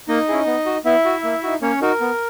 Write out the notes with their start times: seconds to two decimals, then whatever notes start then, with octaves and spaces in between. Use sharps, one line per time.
0.08 A#3 D#4 D#5
0.28 C#4 E4 G#4
0.46 B3
0.66 F#4
0.85 B3 E4 E5
1.05 F#4
1.24 A#3
1.43 D#4 F#4
1.62 A#3 C#4 C#5
1.81 D#4 F#4 A#4
2.01 B3